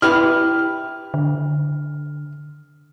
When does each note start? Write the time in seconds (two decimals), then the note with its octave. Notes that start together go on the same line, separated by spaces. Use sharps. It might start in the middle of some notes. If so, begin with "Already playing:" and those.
0.02 E4 G4 B4 F6
1.14 D3